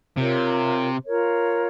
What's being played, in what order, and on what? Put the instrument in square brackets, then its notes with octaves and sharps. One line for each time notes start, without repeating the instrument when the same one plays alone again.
[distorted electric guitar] C3 [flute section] F4 A#4 C#5
[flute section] F4 A#4 C#5